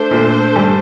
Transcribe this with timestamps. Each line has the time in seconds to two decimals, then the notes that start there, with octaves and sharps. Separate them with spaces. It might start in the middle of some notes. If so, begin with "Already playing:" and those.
Already playing: A3 D4 A4 C5
0.11 A#2
0.56 G2